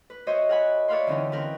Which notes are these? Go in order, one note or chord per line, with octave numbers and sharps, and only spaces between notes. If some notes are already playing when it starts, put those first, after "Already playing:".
B4
F#4 C5 C#5 D#5 E5
A#4 F#5 G#5 B5
C#5 D5 E5 F5 B5 C6
D3 E3 C4 C#4 D#4
C4 A#4 B4